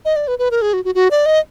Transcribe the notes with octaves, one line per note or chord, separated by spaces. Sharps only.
D#5
D5
B4
B4
A#4
G#4
F#4
F#4
F#4
D5
D#5